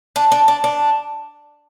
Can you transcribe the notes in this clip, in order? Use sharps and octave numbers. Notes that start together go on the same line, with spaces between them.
D4
D4
D4
D4